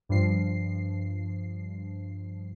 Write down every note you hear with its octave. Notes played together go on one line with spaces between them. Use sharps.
G2 F3 C7